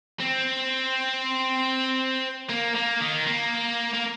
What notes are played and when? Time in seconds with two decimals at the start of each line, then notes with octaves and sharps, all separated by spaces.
0.20 C4
2.49 A#3
2.76 A#3
3.01 D#3
3.27 A#3
3.94 A#3